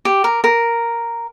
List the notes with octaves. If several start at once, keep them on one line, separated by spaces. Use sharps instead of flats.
G4
A#4
A#4